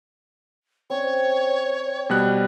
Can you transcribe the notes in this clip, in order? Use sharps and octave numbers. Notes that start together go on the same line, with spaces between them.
C4 C#4 C#5 D5
B2 G3 F#6